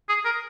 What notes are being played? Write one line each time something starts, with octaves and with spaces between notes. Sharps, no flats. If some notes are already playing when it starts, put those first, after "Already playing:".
G#4
A#4